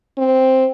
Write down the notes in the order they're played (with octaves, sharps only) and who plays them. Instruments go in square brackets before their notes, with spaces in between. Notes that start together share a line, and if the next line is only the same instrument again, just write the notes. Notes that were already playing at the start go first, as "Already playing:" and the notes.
[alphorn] C4